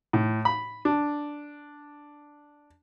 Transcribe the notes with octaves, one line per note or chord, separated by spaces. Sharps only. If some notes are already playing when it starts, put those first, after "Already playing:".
A2
B5
D4